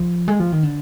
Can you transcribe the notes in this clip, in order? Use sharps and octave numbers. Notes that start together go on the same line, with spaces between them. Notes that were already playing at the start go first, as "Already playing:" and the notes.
Already playing: F3
G#3
F3
D#3
D3